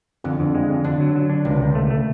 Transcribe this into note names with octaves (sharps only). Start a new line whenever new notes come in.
F2 D3
F2
G#3
F2
D3 D4
F#3
F#3
D4
C#2 C3
C#2
A3
A3